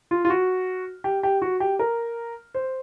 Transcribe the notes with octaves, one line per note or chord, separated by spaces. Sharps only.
F4
F4
F#4
G4
G4
F#4
G4
A#4
C5